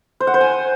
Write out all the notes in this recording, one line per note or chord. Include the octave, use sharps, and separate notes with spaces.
C5
F#5
C5
G#5